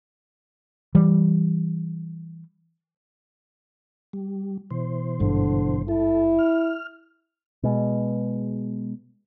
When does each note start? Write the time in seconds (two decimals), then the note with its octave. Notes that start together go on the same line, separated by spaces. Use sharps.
0.95 E3 G3
4.13 G3
4.71 B2 E3 C5
5.20 G#1 G2 D3
5.88 E4 A4
6.39 F6
7.63 B2 G#3